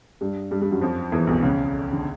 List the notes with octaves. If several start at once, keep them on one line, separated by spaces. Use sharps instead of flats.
G2 G3
G2 G3
G2 G3
F#2 F#3
F2 F3
E2 E3
B1 B2
C#2 C#3
D3